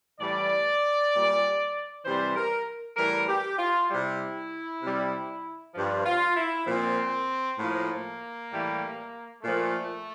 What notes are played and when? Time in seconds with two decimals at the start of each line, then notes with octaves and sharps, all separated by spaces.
0.20 A2 E3 G3 D5
1.13 A#2 G3
2.06 C3 E3 G3 C5
2.36 A#4
2.97 A2 E3 G3 A#4
3.28 G4
3.59 F4
3.90 C3 G3 E4
4.83 C3 G3
5.75 G2 F3
6.06 F4
6.37 E4
6.67 A#2 F3 C4
7.59 A2 F3 A#3
8.52 A2 E3 G3
9.43 A#2 F3 A3